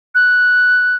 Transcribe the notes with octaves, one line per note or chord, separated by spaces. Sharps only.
F#6